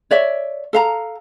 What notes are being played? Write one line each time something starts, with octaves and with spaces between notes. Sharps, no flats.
C#5 D5 E5
A4 F5 A#5